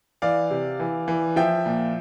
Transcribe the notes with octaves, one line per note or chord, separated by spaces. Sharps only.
E3 D5 F5
C3
E3
E3
F3 E5 G5
A#2